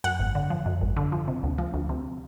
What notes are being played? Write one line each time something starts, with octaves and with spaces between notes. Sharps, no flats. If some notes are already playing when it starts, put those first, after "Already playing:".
F#2 F#5
G#1
D3
F3
F#2
G#1
D3
F3
C3
D2
F3
D2
C3